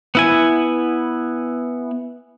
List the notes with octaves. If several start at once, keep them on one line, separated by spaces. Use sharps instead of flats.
B3 E4 G#5